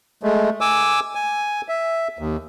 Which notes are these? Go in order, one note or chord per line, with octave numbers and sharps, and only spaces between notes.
G#3 A3
G#5 D6 E6
G#5
E5
D#2